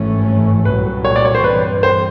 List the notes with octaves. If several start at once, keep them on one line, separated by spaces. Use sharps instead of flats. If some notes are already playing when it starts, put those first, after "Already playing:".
Already playing: G#1 G2 E3 A3 C#4
C2 A#2 F#3 B4
C#5
D5
C#5
C5
G2 E3 G3 C4 B4
C5